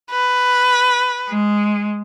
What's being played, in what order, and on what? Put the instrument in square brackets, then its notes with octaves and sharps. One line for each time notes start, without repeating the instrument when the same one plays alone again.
[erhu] B4
[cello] G#3